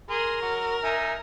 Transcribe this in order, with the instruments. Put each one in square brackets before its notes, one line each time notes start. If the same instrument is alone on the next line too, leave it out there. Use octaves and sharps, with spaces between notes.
[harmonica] G#4 C6 [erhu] A#4
[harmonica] F#3 C#6
D#4 E5 G#5